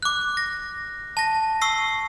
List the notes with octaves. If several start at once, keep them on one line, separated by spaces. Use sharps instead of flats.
D6 F#6
A#6
A5 A#6
C#6 E6 C7